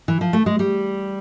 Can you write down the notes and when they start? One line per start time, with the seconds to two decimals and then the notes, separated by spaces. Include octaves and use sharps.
0.08 E3
0.21 F3
0.33 A3
0.46 G#3
0.59 G3